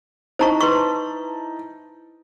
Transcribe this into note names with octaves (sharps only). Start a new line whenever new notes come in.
D#4 E4 C5 A5 A#5 C#6
B4 C6 C#6